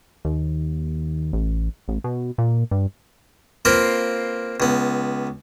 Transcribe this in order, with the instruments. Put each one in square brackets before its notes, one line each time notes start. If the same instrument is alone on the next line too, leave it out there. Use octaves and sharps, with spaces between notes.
[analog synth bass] D#2
A1
A1
B2
A#2
G2
[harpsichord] A#3 C4 F4 B4
C#2 B3